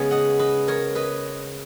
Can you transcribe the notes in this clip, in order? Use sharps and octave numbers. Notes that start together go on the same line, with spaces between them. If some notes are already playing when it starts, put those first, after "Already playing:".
Already playing: C#3 G#3 B3
D#5 F#5
B4 D#5
A#4 C#5
B4 D#5